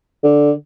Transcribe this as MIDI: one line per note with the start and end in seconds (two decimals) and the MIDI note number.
0.24 0.52 50